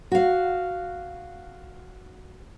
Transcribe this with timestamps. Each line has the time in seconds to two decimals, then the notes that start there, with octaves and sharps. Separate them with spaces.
0.12 F#4 F5